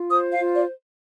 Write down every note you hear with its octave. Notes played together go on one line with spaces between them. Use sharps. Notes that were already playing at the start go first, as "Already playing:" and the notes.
Already playing: F4
C5 D#6
F5
F4
D5